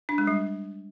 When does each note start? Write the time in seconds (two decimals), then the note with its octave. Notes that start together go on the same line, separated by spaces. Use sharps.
0.09 D4
0.18 G#3
0.27 G3